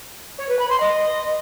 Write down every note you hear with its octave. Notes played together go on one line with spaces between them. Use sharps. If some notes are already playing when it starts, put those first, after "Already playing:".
C#5
B4
B5
C6
D#5